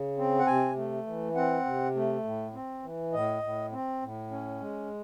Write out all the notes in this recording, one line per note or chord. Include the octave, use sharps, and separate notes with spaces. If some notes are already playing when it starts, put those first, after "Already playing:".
Already playing: C#3
C4
F#5
C3 G#5
A3
E3
C4 F#5
C3
A3
A2
C4
E3
A2 D#5
A2
C4
A2
C#4
G#3